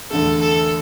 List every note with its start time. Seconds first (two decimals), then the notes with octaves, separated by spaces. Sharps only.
0.11 E2 D3 A3 A4
0.40 A4